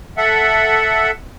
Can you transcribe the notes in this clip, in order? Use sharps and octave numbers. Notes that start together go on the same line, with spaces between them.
A4 E5 F#5